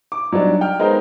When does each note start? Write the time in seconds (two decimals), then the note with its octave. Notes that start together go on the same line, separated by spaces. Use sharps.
0.12 D6
0.33 F#3 G3 D4 D#4
0.61 G5 F6
0.79 G#3 B3 D#4 A#4 C5 D#5